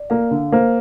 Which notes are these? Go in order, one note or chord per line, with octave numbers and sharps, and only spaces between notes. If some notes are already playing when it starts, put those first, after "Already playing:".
Already playing: D5
A#3 F5
D3
A#3 C5